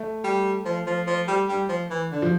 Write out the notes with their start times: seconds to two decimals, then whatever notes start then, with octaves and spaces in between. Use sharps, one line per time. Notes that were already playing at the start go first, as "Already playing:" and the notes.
Already playing: A3
0.24 G3
0.65 F3
0.87 F3
1.07 F3
1.28 G3
1.49 G3
1.69 F3
1.90 E3
2.11 D3
2.22 F3